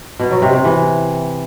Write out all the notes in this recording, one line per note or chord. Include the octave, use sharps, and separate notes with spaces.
B2
F#3
C3
C3
E3